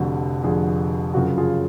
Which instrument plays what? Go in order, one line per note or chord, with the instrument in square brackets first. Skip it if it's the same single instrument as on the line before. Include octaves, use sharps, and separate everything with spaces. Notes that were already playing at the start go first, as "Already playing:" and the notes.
Already playing: [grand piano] F1 F2 D3 F#4
F1 F2 D3 F4 G#4
F#2 C#3 F3 F#4
F4 G#4